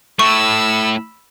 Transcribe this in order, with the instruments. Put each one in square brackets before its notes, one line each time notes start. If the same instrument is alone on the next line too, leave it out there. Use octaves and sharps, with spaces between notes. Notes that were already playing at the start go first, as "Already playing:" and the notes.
[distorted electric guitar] A2 [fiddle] B5 E6 [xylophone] C#6